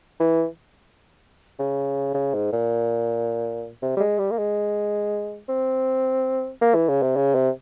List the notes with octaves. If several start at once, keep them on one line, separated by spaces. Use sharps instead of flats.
E3
C#3
C#3
G#2
A#2
C3
G3
G#3
G3
A#3
G#3
C4
A#3
E3
C#3
C3
C#3
C3